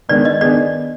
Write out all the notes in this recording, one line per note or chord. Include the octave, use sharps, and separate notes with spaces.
D#3 G#3 B3 D4 D5
D#5
D#3 B3 D4 G#4 D5